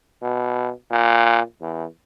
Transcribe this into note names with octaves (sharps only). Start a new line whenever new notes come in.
B2
A#2
E2